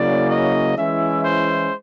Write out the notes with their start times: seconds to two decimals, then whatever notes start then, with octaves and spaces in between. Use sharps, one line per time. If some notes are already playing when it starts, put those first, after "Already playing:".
Already playing: C#3 F#3 A#3 C#4 E4 D5
0.30 D#5
0.77 E3 G#3 C#4 E4 E5
1.25 C5